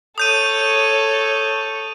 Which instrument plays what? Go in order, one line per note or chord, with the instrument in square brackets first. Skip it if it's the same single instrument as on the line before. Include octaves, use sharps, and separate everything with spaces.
[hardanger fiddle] A4 C#5 [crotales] D#6 G6 D#7